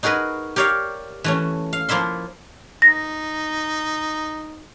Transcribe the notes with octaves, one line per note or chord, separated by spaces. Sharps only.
D#4 F#4 G#4 A#4 B4
G4 A#4 C#5 D5 F5
E3 A3 C#4
F5
F3 A#3 E4 E5 C6
D#4 A#6